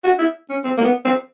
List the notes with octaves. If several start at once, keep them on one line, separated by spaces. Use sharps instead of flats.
F#4
E4
C#4
C4
A#3
B3
C4